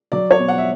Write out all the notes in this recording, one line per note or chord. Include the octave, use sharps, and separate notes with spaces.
F#3 D5
C#5
B2
F#5
E5